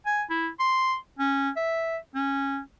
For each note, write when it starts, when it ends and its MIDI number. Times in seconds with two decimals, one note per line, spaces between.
0.06 0.23 80
0.30 0.49 64
0.60 0.95 84
1.19 1.50 61
1.56 1.97 76
2.15 2.59 61